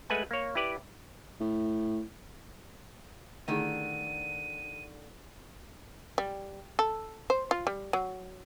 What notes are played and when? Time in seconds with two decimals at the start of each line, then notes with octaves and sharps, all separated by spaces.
0.10 G#3 A3 B4 F#5 G#5
0.31 A#3 C#5
0.55 E4 G4 B4 D5
1.40 A2
3.48 D3 D#3 A3 E4 G#4 D#7
6.18 G3
6.79 A4
7.30 C5
7.51 F4
7.67 G3
7.93 F#3